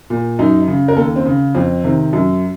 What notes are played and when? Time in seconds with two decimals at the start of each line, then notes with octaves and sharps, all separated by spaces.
0.10 A#2
0.39 F#2 D#4
0.68 C#3
0.88 A#4
0.96 D#2 A4
1.16 C4
1.26 C#3
1.54 F2 C4
1.84 C3 D#3
2.13 F#2